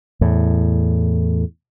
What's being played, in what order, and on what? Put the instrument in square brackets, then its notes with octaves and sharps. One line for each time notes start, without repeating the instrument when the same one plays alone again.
[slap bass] E2 A2